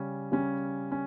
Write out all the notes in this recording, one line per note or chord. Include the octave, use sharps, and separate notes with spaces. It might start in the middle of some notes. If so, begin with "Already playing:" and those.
Already playing: C#3 G3 C#4
C#3 G3 C#4
C#4